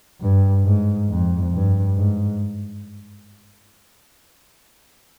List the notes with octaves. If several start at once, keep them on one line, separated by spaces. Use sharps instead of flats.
G2
G#2
F2
G2
G#2